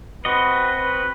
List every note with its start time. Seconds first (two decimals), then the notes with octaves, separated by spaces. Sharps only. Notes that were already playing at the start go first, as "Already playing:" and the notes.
0.25 C4 F#4 B4 D#5
0.79 B4